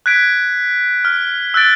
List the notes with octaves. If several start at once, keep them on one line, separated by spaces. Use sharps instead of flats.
F#6 G#6 B6 D7
F6
E6 F#6 G6 A6 D7